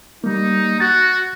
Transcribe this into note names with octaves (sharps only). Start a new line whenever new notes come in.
G3 A#3 D#4
F#4 A6